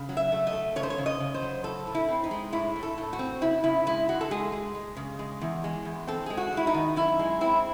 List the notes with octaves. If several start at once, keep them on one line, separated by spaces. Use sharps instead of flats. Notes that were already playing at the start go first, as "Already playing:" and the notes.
Already playing: C#3
F#3
E5
A3
D#5
A3
C#3 C#5
C5
C#5
C#3
D#5
C#3
C5
F#3
A2 A4
A2
E4
C4
D#4
G#3
A2 E4
A2
A4
A2
F#4
C4
C#3 E4
C#3 E4
G#3 E4
G#3 F#4
A4
G#3 G#4
G#3
G#3
C#3
G#3
E2
G#3
E2
C4 A4
G#3 G#4
F#4
G#3 E4
D#4
D#3
F#2 E4
G#3
C4 E4